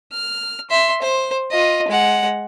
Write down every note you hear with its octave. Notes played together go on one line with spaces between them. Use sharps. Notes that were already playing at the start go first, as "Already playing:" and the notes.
F6
E5 C6
C5
F4 D#5
G#3 F#5